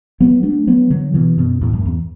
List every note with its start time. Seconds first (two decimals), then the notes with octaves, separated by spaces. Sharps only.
0.20 F#3 B3
0.43 A3 D4
0.67 F#3 B3
0.90 D3 F#3
1.14 B2 E3
1.38 F#2 B2
1.61 E2 A2
1.73 F#2
1.85 E2